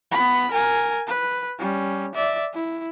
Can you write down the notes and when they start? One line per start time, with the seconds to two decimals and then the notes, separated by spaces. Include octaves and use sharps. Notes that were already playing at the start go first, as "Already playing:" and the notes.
0.11 B3 B5
0.52 A#4 G#5
1.07 B4
1.59 G3 C#4
2.15 D5 E5
2.53 E4